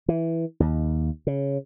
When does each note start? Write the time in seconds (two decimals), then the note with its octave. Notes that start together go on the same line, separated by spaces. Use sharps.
0.08 E3
0.60 D#2
1.27 C#3